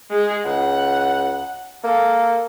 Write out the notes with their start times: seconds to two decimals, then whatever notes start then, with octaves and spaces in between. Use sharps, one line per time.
0.11 G#3 G#4
0.45 C#2 F#5
1.84 A#3 A4